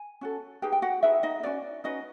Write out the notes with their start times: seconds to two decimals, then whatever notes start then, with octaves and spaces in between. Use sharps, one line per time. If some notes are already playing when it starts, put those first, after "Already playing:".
Already playing: G#5
0.21 C#4 F#4 A4
0.62 D#4 G4 G#4 B4 G5
0.72 G5
0.82 F#4 F#5
1.03 D#4 E4 G#4 B4 E5
1.23 D#4 D#5
1.43 C#4 D4 F#4 B4 D5
1.84 C#4 D#4 F#4 B4 D#5